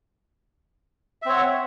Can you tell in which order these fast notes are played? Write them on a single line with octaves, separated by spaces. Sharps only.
E5 C4 C#5 F#5